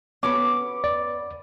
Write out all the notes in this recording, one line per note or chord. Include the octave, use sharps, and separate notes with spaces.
B3 C#4 D6
D5